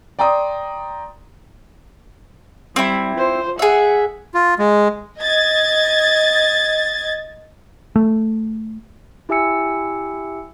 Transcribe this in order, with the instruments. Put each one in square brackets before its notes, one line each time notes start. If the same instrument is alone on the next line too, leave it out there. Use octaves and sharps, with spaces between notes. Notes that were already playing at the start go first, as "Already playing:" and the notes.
[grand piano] D5 G5 A#5 C6 D#6
[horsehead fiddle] G3 [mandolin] C4 E4
[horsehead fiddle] F4 C5
[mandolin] G#4 E5 [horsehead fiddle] F#5
[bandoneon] F4
G#3
[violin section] D#5 G#6 A6
[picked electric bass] A3
[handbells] E4 G4 E5 G#5 E6 C#7